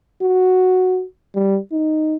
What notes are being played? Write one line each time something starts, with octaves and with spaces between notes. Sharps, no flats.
F#4
G3
D#4